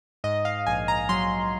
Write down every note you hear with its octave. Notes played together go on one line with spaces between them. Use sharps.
G#2 D#5
F5
A#1 G#5
A#5
F#3 C6